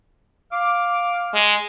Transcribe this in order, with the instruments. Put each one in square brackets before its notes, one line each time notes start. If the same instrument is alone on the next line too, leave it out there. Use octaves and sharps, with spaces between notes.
[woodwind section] F5 D6
[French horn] G#3